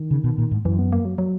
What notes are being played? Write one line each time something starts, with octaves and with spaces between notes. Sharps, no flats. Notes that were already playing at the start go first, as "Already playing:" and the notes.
Already playing: D#3
C#3
B2
A#2
G#2
F#2 E3
B3
A#3
F#3
F#3